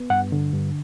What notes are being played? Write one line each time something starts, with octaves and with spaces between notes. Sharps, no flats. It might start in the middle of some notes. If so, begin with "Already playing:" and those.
Already playing: B3
G2 F#5
D3
G2